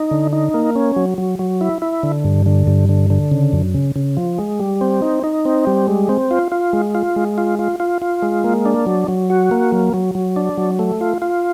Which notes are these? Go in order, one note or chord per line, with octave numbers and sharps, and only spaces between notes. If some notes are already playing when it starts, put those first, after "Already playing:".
Already playing: D#4
D3
D#4
A#3
C#4
F#3
F#3
F#3
E4
E4
D3
G2
D3
G2
D3
D3
C#3
F#2
C#3
C#3
F3
G#3
G3
C4
D#4
D#4
C4
G3
G#3
C4
F4
F4
G#3
F4
G#3
F4
F4
F4
F4
G#3
A#3
D4
F#3
F#3
F#4
A#3
F#3
F#3
F#3
D4
F#3
A3
F4
F4